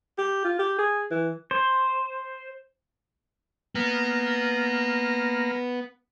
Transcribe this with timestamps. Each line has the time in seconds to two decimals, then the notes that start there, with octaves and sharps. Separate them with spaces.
0.18 G4
0.45 F4
0.59 G4
0.79 G#4
1.11 E3
1.51 C5
3.75 A#3 B3